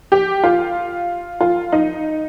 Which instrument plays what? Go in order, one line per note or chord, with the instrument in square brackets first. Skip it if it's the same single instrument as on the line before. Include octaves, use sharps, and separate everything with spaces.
[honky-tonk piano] G4
F4
F4
D#4